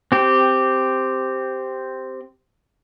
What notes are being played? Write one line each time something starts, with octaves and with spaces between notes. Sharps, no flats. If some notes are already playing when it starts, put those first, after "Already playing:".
C4 G4